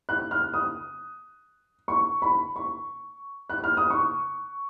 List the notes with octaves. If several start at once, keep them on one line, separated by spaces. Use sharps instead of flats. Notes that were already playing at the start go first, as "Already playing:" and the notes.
F#6
F6
D#6
C#6
B5
C#6
F#6
F6
D#6
C#6